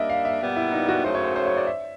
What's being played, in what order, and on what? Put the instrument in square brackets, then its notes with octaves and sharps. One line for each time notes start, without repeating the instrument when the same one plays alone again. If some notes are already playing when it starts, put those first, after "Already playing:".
Already playing: [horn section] G3 A#3 D4 [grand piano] D#5 E5
[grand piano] F5
E5
[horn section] A#2 G3 B3
[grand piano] E4
D#4
F#4
[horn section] F#2 C#3 F#3 A3 [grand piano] C5
[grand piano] C#5
C5
C5
C#5
D5
E5